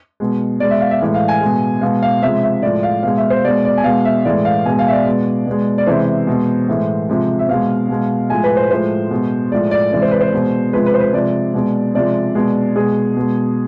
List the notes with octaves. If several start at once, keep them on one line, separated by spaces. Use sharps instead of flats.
B2 G#3
B2 G#3 D5
E5
F5
E5
A2 E3 G#3
F5
G#5
G#3
B2
B2 G#3 F5
F5
C3 F3 G#3 E5
E5
A2 F3 G#3 D5
F5
B2 G#3 F5
E5
C5
B2 G#3 D5
D5
G#5
B2 G#3 F5
E5
A2 E3 G#3 D5
F5
B2 G#3 G#5
F5
E5
D5
B2 G#3
B2 G#3
D5
C3 E3 G#3 C5
B2 G#3
A2 E3 G#3
C3 F3 G#3
E5
B2 G#3 F5
B2 G#3
A2 F3 G#3 G#5
B4
C5
A2 F3 G#3 C5
B2 G#3
A2 F3 G#3 D5
D5
C3 E3 G#3 D5
C5
B4
C5
B2 G#3
C3 F3 G#3 B4
B4
C5
B4
C3 F3 G#3 D5
B2 G#3
C3 F3 G#3 D5
B2 G#3
B2 G#3 G#4
B2 G#3